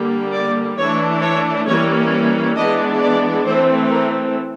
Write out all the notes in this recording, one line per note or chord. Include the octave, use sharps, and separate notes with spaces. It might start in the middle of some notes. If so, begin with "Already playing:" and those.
Already playing: D3 G3 A#3
D5
E3 A3 D4 C#5
C#5
E3 G3 A#3 C#4 C#5
E3 G#3 B3 D4 D#5
D5
E3 A3 C4 C5
A#4